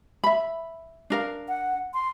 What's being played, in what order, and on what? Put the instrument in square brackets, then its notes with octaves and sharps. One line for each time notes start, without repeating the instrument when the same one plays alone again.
[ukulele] E5 B5
D4 A#4 F5
[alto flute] F#5
C6